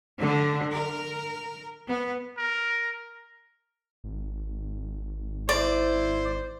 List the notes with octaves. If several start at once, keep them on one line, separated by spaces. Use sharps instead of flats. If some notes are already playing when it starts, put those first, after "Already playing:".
D3
A#4
B3
A#4
G#1
E4 C5 D5